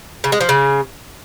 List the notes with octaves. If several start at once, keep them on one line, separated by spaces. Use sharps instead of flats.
C#3
G#3
F3
C#3